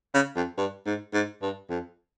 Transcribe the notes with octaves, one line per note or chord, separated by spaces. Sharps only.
C#3
F2
G2
G#2
G#2
G2
F2